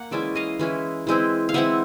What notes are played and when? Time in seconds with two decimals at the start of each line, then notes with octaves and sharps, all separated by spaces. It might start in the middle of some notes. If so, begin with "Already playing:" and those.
Already playing: A#3 F#5
0.11 E3 G#3 C#4 E4 D5 E5
0.35 D#5 F5
0.59 E3 G#3 C#4 E4
1.07 E3 G#3 C4 E4
1.49 F5
1.54 E3 G#3 C4 E4 E5 F#5